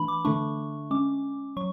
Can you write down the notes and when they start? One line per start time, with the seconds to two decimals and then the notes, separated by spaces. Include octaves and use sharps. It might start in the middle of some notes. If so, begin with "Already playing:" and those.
Already playing: E3 A3 D4 B5
0.08 D6
0.25 D3 A3 D4 C#6
0.91 G#3 C#4 D6
1.57 F#3 C#6